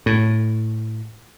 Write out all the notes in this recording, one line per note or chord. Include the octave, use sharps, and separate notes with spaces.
A2